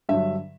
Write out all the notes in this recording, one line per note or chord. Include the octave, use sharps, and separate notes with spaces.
G2 D3 F#3 E5